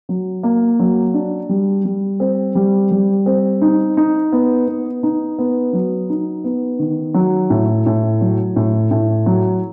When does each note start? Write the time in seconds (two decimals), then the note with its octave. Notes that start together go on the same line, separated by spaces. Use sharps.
0.09 F#3
0.43 A#3
0.79 F#3
1.14 D4
1.49 G3
1.85 G3
2.20 C4
2.55 G3
2.91 G3
3.26 C4
3.62 D#4
3.97 D#4
4.32 B3
4.67 B3
5.03 D#4
5.39 B3
5.73 F#3
6.10 D#4
6.44 B3
6.79 D#3
7.14 F#3
7.50 A2
7.86 A2
8.21 F#3
8.56 A2
8.91 A2
9.26 F#3